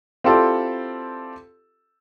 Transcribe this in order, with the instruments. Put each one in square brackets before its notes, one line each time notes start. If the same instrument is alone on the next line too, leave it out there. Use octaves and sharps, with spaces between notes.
[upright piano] C4 E4 F4 G4 A4 D5